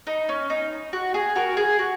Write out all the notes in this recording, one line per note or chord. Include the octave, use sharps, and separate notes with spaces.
D#4
C#4
D#4
F#4
G#4
F#4 A#4
G#4
F#4